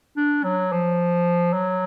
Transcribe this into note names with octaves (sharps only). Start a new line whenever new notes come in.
D4
F#3
F3
F#3